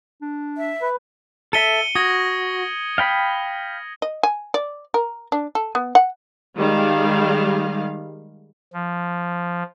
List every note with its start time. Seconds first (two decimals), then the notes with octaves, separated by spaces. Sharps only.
0.21 D4
0.57 E5
0.82 B4
1.53 A4 E5 C#7 D#7 G7
1.95 F#4 D#6 G#6 A#6
2.98 F5 G5 B5
4.02 D#5
4.23 G#5
4.54 D5
4.94 A#4
5.32 D4
5.55 A4
5.75 B3
5.95 F#5
6.57 D#3 G3 G#3 F5
8.73 F3